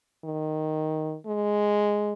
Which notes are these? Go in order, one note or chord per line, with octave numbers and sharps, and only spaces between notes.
D#3
G#3